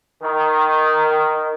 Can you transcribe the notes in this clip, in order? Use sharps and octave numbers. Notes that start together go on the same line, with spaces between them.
D#3